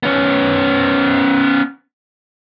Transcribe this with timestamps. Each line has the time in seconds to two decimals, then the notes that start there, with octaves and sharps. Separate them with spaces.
0.03 B3 C#4